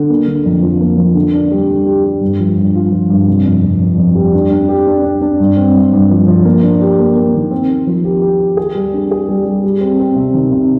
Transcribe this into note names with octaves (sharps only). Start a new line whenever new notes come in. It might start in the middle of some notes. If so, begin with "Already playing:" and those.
Already playing: D3
A#3
D3
F2
F3
A#3
F3
D3
D4
G3
D3
G4
G4
G2
F3
G2
F4
F3
G2
C3
F2
F2
F2
F2
G3
D4
D4
G4
D4
D4
D4
G2
C4
G2
G2
F3
F3
A#3
D4
G4
A#3
A#3
D#3
C4
C4
F3
G4
G4
G4
G#4
G3
D4
G#4
G3
G3
G3
C4
C4
C3
D#3
C3